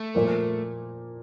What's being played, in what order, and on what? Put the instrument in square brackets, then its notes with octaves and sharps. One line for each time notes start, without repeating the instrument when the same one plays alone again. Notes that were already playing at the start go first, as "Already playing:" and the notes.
Already playing: [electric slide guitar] A3
[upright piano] A#2 F3 A#3